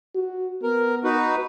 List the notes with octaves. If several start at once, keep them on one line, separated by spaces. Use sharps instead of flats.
F#4
B3 A#4
D#4 F#4 B4